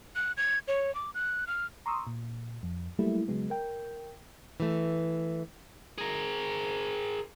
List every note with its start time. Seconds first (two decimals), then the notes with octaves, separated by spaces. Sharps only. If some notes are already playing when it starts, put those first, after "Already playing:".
0.15 F#6
0.37 G#6
0.68 C#5
0.95 D6
1.14 F#6
1.47 F6
1.86 A#5 C6 C#6 D#6 E6
2.07 A#2
2.63 F2
2.99 F#3 G3 A3 A#3 E4
3.28 C#3 F#3 G#3 B3
3.50 A#4 G5
4.60 E3 A3
5.98 G#4 A#4